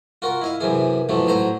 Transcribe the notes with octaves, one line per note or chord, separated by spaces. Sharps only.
F4 F#4 A#4
E4 D#5 F5
F#2 C3 E3 G#4
B1 B2 E3 F3 A3
A2 F#3 C5 A#5